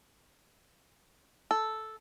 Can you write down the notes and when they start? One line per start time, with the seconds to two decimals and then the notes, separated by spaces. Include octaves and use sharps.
1.51 A4